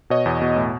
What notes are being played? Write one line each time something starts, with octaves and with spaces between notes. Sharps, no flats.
B2 C#5 D#5
E2
B2
A2